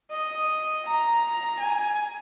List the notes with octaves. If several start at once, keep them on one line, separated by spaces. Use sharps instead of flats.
D#5
A#5
G#5